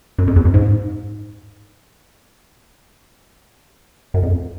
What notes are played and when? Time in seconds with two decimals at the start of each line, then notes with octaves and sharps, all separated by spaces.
0.18 F#2
0.28 F2
0.36 E2
0.45 F#2
0.54 G#2
4.14 F#2
4.23 F2